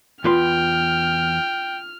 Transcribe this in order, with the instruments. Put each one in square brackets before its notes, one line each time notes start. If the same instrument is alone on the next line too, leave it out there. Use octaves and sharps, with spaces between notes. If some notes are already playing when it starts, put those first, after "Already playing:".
[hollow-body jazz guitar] E2 B4 C6 [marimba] F4 [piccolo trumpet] G5 [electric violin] F6